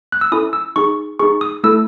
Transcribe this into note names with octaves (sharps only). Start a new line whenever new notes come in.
F#6
E6
C#4 E4 A4 D#6
E6
D#4 G#4 C#6
D#4 G#4 C#6
D#6
A3 E4 A4 E6